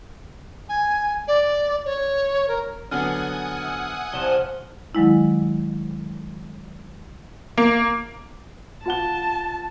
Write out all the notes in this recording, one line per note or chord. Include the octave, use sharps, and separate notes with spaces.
G#5
D5
C#5
A#4
D3 F#3 B3 F#5 G#5 D#6 F6
E5
C2 C3 F3 F#6 E7 G7
D#3 F#3 G#3 E4
A#3
F4 F#5 A5 G7